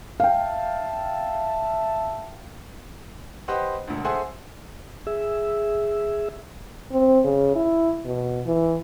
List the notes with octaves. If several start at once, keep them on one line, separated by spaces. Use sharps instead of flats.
E5 F5 G5 A5
G4 B4 C5 D#5 F#5
E1 D2
G#4 A4 C5 E5 F#5 G#5
G#4 E5
C4
C#3
E4
B2
E3